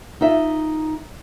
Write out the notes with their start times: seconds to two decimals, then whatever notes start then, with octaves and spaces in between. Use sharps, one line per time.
0.21 D#4 F4 E5